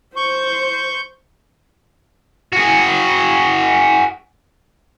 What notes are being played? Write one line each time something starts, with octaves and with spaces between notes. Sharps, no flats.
C5 C#6 G6
F#4 G#4